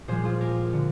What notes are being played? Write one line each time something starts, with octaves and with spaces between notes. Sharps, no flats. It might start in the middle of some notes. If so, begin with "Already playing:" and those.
A#2 F3 G#3 G#4 C5
F4 G#4
G4 A#4
D3